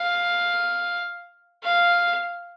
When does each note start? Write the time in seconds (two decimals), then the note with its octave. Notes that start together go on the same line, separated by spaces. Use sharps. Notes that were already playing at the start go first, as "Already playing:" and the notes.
Already playing: F5
1.63 F5